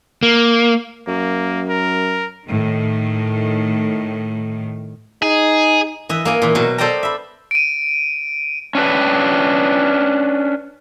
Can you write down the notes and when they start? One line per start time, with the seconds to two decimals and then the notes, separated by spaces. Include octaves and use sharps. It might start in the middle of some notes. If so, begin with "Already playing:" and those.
0.23 A#3
1.07 F#2 A#3
1.69 A#4
2.47 A2 D#3
5.22 D#4 G#4
6.09 E3 D#5 E5
6.25 A#3 D#5 G#5
6.42 A#2 E3
6.55 B2 F#3 A#4
6.78 A4 C5 D5 D#5 G5 A#5
7.03 E5 B5
7.51 D7 D#7
8.75 C#4 D4 B4